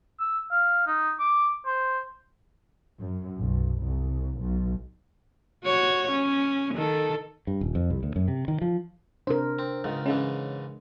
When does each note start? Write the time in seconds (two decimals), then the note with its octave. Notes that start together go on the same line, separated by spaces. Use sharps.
0.20 E6
0.51 F5
0.87 D#4
1.20 D6
1.66 C5
2.98 F#2
3.40 B1
3.83 C2
4.39 B1
5.64 F#4 C#5
6.11 C#4
6.75 D#3 A4
7.47 G2
7.61 D#1
7.75 F2
7.90 C2
8.03 D2
8.16 F#2
8.28 C3
8.48 D#3
8.62 F3
9.27 C3 D4 A#4 C5
9.59 C4
9.84 C#2 G#2 D#3 G#3
10.06 G#2 C#3 E3 C#4